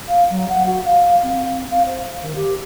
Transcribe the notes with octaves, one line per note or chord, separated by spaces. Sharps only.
F5
F#3
F#5
F#4
F5
C4
F5
C5
D#3
G4